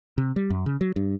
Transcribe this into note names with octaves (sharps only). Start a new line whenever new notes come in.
C3
G3
F#2
C#3
F#3
G2